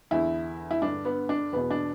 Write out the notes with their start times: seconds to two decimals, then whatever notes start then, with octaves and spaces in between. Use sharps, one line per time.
0.11 E2 D3 E4
0.71 E4
0.82 G2 D3 D4
1.05 B3
1.29 D4
1.53 E2 B2 B3
1.70 D4